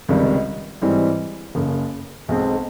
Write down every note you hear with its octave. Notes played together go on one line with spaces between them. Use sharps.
C#2 C3 D#3 G3
G#2 E3 G3 C4
F#1 F#2 C#3
B1 B2 G#3 C4